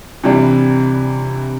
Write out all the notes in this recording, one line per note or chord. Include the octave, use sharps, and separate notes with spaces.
C3 E3 G3 D4